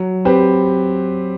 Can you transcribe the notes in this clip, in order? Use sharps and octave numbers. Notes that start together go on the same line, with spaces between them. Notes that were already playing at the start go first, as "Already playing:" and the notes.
Already playing: F#3
C4 G4 B4